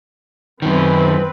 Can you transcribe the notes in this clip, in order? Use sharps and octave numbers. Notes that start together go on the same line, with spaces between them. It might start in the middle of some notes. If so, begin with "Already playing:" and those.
F#2 D#3 C4 B4